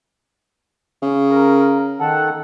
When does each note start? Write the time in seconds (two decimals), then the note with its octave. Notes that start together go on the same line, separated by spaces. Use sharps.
1.02 C#3
1.30 A#4
2.00 D#3 A4 F#5